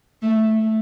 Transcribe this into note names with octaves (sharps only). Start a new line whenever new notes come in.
A3